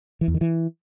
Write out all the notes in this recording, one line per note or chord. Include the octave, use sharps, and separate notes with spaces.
E3
E2
D#3
E3